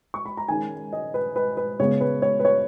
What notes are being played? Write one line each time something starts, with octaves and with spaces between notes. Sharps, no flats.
C#6
B5
A#5
D#3 G#3 C#4 G#5
D#5
B4
B4
B4
C#3 G#3 B3 C#5
B4
C#5
B4
C#5